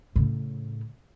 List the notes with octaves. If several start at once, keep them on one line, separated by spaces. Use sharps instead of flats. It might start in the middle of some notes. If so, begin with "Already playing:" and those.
A2 C#3